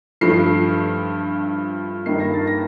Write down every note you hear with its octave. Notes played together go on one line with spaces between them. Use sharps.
G2 F3 A3 C7
G2 D#3 A#3 C7
A#6
A6
A#6